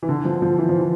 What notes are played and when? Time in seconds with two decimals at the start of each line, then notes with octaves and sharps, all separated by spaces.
0.03 E3
0.09 D3
0.25 F3
0.42 F3
0.58 E3
0.69 F3
0.79 E3